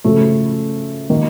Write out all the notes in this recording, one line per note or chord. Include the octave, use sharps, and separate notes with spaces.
C#3 F3 A3
D#3 A#3